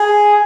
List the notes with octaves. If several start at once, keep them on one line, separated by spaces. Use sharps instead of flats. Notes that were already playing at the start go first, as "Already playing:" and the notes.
Already playing: G#4